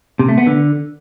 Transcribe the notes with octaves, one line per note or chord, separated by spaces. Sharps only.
C3
A3
B3
D3